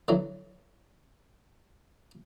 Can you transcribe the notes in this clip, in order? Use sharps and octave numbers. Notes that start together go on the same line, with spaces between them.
D3 E3 F#3